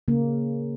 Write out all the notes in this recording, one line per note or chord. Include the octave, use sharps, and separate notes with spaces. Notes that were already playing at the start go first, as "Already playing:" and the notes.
C#3 A#3